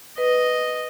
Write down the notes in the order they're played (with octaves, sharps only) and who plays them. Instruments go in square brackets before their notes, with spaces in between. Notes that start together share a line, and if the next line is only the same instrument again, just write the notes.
[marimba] B4 [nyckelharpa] D#5